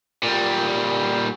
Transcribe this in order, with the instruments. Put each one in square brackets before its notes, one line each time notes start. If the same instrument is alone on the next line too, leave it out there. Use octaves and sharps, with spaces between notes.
[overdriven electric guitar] A#2 G3